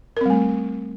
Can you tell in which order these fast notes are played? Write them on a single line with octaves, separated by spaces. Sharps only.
A#4 C4 G3 A3